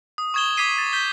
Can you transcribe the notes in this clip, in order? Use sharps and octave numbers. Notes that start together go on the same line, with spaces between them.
D#6
C#6 D#6 G#6 E7 G7
D6 G#6 B6 C7 D#7
A6
G6 B6 G7